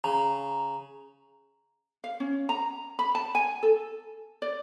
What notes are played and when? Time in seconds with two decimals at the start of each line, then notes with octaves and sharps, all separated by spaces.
0.04 C#3 A#5
2.04 F5
2.20 C#4
2.49 A#5
2.99 B5
3.15 A5
3.35 G#5
3.63 A4
4.42 D5